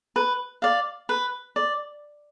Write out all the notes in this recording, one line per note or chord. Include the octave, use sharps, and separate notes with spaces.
B4
D5 F5
B4
D5